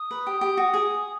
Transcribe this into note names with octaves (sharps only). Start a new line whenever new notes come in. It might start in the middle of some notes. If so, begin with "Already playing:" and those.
Already playing: D#6
B4
G4
G4
F#4
G#4